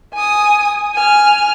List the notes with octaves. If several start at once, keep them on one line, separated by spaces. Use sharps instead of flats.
G#5 D#6
G#5 F6